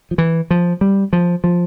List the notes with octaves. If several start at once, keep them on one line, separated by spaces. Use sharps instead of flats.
F3
E3
F3
G3
F3
F3